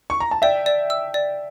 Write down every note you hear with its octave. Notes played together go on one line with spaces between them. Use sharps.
C#6
A#5
A5
D5 E5 G5
D5
E6
D5